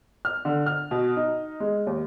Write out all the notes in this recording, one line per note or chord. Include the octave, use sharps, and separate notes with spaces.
F6
D3
F6
B2
D#4
G#3
D#2